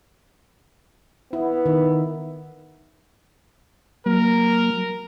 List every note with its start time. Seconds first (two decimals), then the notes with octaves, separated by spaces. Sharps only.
1.33 B3 E4
1.66 D#3
4.06 F#3 A#3 A#4